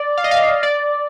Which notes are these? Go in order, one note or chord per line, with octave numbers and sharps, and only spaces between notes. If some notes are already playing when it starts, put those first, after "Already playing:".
Already playing: D5
F5
D#5
F5
D5